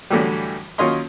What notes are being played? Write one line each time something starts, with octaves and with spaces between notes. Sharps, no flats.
A2 D3 E3 F#3 G3
D#2 F#3 C#4 F4 D#5 C6